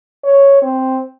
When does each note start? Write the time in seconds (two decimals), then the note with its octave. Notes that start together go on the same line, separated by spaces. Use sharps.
0.24 C#5
0.62 C4